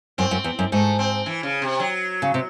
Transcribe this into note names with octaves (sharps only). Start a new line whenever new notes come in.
F#2 C4
F#2
E2
F#2
G#2 A3
C4
E3
C#3
C3
F#3
C#3
C3